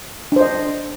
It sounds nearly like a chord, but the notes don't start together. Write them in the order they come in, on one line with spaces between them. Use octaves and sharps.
D4 C5 D#5